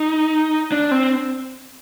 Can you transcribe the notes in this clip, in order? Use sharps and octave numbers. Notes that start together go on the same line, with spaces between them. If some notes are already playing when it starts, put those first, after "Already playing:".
Already playing: D#4
D4
C4